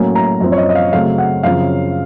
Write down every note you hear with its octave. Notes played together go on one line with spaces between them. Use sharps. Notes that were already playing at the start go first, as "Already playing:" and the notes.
Already playing: A2 F#3 A#3 C#4
A#5
F#2 F3 C4
C#5
D#5
D#5
F5
C#3 F#3 A3 C4 F5
F#5
F#2 C#3 F3 C4 F5